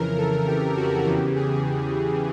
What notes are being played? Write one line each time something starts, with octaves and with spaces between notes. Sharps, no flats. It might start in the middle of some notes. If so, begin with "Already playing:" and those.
Already playing: F2 C#3 E3 A#4
A4
G4
F#4
E2 C#3 E3 G4
G#4